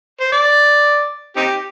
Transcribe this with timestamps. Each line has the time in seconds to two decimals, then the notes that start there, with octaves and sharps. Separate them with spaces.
0.21 C5
0.32 D5
1.37 C4 D#4 G4